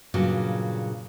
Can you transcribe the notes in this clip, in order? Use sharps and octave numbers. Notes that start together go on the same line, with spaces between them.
G2 A#2 C#3 F#3